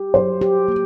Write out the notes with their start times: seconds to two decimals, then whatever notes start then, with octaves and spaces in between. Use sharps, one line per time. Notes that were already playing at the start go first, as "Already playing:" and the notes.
Already playing: G4
0.14 F#3 C5
0.41 G4
0.68 A#3